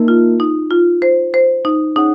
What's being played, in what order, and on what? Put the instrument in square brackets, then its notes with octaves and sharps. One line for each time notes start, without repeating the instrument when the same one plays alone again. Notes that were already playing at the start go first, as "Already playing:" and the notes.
Already playing: [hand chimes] A#3 D#4 A#4
[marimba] F4
D#4
F4
C5
C5
D#4
[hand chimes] C#4 G#4 C#5 F#5 [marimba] D#4